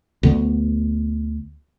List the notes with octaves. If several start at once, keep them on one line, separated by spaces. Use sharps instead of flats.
D2 D3 B3